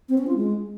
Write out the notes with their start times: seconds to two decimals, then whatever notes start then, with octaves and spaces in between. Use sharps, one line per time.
0.09 C4
0.18 C#4
0.27 F4
0.36 G#3